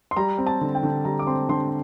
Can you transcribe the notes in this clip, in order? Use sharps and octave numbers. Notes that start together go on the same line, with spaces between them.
C6
G3 A#5
C4
A5
D3
G5
D3
G3 A#5
D6
C4 C6
D3 C6